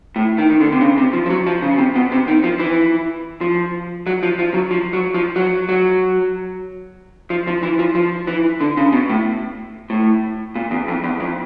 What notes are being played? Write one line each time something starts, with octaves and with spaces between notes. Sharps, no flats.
A2
D#3
D#3
D3
C3
C#3
C3
F3
F3
F#3
F3
C#3
C3
B2
C3
D#3
F3
E3
F3
F#3
F3
F3
F#3
F3
F#3
F3
F#3
F#3
F3
F3
E3
F3
F3
E3
D3
C#3
B2
A2
A2
A#2
E2
F2
E2
F2